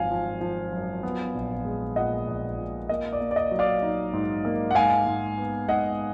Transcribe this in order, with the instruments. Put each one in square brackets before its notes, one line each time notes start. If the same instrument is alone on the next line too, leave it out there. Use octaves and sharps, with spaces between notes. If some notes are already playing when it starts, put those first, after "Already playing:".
Already playing: [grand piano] G#1 F#2 F3 F5 G#5
F3
F3
F#2
B3
A#1
G#3
A#2 D#5 F#5
A#1
A#2
A#3 D#5
D5
A#3
D5
D#5
F#3
D5 F5
D#4
G#2
A#3
F#5
G#2 F5 G#5
G#2
B3
G#2 D#5 F#5